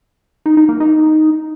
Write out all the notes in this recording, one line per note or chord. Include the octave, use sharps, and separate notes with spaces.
D#4
D#4
A#3
D#4